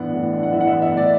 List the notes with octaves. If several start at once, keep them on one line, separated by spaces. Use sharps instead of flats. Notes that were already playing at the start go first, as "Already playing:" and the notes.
Already playing: A2 E3 B3 D4 F#5
A2
D4
F#5
E3 E5
F#5
E5
B3
E5
A2
D5